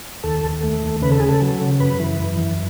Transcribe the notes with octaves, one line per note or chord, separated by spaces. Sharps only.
D#2 A4
D#2
A3
D#2
C#3 B4
A4
C#3 G#4
A4
F#3
C#3
F#2 B4
E3
F#2
F#2